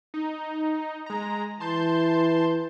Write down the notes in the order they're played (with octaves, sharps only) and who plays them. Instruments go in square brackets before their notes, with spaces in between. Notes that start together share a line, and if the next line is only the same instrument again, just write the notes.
[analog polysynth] D#4
G#3 A#5
[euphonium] E3 [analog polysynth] A5 C6 G6